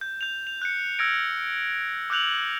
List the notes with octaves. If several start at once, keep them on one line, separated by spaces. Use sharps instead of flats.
G6
G6 F7
F7
F#6 G6 C#7
E6 F6 G#6 A#6 D7
D6 E6 F#6 G6 F7 F#7